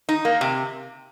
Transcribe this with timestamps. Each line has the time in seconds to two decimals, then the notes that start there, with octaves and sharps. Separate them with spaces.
0.09 D#4
0.25 A#3
0.41 C3